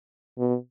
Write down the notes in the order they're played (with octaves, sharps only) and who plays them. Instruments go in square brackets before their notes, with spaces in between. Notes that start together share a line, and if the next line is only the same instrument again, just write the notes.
[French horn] B2